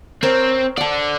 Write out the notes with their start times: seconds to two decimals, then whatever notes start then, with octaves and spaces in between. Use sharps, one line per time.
0.23 C4 A#4 C5 C#5
0.77 A4 D5 F#5 A5